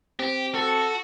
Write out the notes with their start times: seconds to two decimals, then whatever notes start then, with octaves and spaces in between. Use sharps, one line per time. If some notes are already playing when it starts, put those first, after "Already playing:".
0.20 C4 G4
0.55 F#4 A4